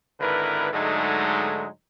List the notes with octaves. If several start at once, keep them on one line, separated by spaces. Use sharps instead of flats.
G#1 D3 E4 A#4 B4
G#2 D3 F#3 G#3 A3 D#4